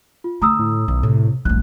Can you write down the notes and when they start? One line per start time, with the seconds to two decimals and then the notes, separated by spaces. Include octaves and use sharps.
0.24 F4
0.42 D3 A3 A#5 D#6 E6
0.59 A2
0.88 B1 D#3
1.03 A2 C3
1.45 D1 A#1 G2 F#6